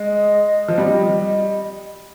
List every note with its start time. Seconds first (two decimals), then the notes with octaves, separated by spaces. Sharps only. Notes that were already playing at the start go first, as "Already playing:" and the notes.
Already playing: G#3 D#5
0.68 F3
0.78 G3